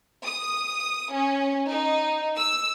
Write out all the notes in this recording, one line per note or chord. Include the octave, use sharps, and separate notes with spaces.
D#6
C#4
D#4
E6